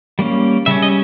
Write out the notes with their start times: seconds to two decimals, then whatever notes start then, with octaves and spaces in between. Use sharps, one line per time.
0.19 G3 A#3 C#4
0.66 C#3 G3 C#4 E5
0.82 D#5